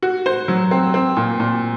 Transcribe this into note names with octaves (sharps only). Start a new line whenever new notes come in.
F#4
C5
F#3
C4
C4
A#2
A#2